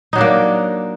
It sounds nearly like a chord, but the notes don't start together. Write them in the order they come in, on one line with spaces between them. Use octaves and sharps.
D#4 F#3 D4 A#3